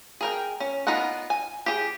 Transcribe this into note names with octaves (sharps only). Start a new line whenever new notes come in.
G#4 A#4 G5
C#4
B3 D#4 F4 A#4 F#5
G#5
G4 G#4